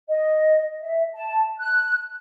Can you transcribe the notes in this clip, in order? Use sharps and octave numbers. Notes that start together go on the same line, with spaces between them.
D#5
E5
A5
F#6